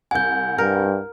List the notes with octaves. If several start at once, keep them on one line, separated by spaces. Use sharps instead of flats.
C2 F#5 G#5 G6
G2 A#4